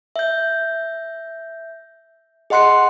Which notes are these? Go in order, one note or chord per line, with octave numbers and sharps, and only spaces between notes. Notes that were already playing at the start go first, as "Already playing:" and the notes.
E5 G6
G#4 D#5 F#5 C6 F#6 C#7